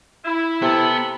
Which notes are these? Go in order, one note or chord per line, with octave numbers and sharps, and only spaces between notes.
E4
C3 B3 A4 B4